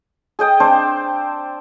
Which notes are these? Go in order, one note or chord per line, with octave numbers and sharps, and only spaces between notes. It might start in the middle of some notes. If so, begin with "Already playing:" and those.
G#4 D#5 G5 D#6
C4 D4 C5 A5